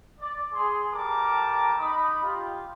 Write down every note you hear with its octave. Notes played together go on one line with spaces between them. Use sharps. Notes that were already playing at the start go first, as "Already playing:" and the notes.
D5
G#4 C6
G3 A4 A#4 A5 A#5 D6
D#4 B5 D#6
F4 G4